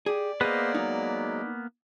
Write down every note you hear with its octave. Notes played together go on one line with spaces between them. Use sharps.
G4 G#4 D5
A#3 B3 G#4 B4 C5 D#5
F#3 G#3 D#4